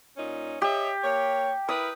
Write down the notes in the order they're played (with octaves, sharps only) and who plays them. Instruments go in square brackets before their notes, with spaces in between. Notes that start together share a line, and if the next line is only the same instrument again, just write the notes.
[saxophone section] A#2 C#4 D#4
[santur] G4 [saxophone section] C#5 D#5 E5
[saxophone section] A#3 C#5
[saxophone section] E4 A#4 B4 [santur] D#6